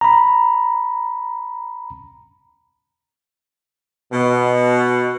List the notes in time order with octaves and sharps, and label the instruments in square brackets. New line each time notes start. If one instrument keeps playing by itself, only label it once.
[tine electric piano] A#5 B5
[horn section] B2